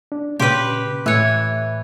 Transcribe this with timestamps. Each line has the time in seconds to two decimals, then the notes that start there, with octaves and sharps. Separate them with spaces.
0.12 D4
0.40 A#2 C#3 G4 B4 C6
1.06 A2 E3 C#5 E5 F#6